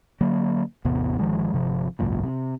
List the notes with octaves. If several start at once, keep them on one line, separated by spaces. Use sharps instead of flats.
D3 F#3 A#3
A1 E2 C3 B3
G1 D#3 F3 G#3
G1 C3 F3
G#1 C#2 F#2 A#2
C3